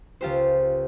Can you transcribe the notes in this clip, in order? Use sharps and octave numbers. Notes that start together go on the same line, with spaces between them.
C#2 F4 G4 C5